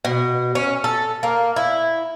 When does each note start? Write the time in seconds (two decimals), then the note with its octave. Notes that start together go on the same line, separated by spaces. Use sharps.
0.05 B2
0.55 C#4
0.84 A4
1.23 A#3
1.56 E4